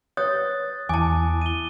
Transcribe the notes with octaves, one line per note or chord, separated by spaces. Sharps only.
B4 C#5 D#6 F#6 A6
E2 E4 G#5 A5 D6
D#7 G7